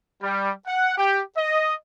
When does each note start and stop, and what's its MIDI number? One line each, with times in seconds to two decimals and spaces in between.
0.23 0.52 55
0.67 0.94 78
0.97 1.21 67
1.37 1.75 75